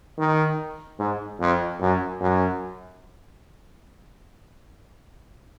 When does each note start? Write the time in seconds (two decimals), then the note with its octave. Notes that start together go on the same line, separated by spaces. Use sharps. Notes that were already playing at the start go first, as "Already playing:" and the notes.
0.18 D#3
0.99 G#2
1.40 F2
1.80 F#2
2.20 F#2